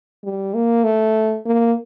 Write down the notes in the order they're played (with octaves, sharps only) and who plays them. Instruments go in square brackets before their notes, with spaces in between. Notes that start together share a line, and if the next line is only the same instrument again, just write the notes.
[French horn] G3
A#3
A3
A#3